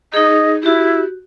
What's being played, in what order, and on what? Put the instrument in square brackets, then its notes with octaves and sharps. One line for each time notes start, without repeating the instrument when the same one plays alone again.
[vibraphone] D#4 G#4 [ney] D#5
[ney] E4 [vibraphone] F#4 G4